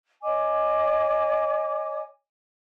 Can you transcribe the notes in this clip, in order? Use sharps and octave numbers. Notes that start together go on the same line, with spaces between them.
C#5 D#5 G#5 D6